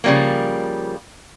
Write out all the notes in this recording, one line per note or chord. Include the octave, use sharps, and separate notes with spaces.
C#3 F3 G3 G#3 A#3